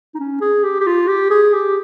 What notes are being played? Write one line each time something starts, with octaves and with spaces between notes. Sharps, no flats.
D#4
C#4
G#4
G4
G4
F4
G4
G#4
G4